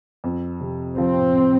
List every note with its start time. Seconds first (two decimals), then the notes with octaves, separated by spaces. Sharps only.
0.24 F2
0.61 C3
0.98 F3 C4